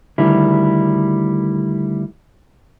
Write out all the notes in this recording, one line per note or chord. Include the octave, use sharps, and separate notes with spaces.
D2 D#3 G3 E4